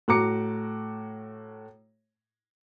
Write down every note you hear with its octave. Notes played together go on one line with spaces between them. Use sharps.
A2 F#4 A#5 D6 C#7